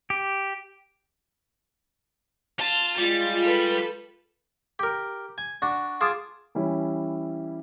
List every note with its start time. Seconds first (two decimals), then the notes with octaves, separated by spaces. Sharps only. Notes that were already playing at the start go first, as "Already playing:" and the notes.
0.10 G4
2.59 F4 A5
2.98 G3 G#3 F4 A6
3.43 A4 B4
4.79 G4 A#4
5.38 G#5
5.62 D4 F#4
6.01 F4 G#4 A5 D6 D#6
6.55 E3 G3 C#4 E4